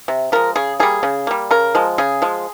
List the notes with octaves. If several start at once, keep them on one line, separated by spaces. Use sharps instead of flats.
C3
F3 G#3 A#4
C#3 G#4
G3 A#3 G#4
C#3
G3 A#3
C#3 A#4
F3 G#3
C#3 G#4
F3 G#3